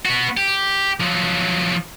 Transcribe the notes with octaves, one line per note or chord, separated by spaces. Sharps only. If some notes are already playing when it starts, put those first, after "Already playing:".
B3 F#4
G4
F3 F#3